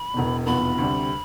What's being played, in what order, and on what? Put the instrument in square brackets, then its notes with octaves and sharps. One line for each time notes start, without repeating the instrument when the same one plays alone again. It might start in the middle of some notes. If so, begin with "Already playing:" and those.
Already playing: [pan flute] B5
[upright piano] E1 E2 B2
[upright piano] F1 E2 B2 B3 F4 [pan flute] B5
[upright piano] D2 C3 G3